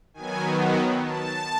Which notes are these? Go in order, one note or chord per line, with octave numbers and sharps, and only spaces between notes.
D#3 F#3 B3 G#5
A5